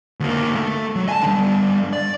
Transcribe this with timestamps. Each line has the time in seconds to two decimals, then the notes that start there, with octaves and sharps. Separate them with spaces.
0.20 D2 A#3
0.55 A3
0.96 F#3
1.09 G#5 A5
1.23 D3 G3
1.93 D5